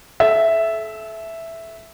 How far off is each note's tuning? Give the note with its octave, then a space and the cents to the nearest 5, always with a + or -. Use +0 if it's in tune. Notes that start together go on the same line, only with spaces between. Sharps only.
A4 -35 E5 +0